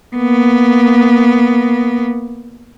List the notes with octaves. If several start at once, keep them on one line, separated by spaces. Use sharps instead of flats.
A#3 B3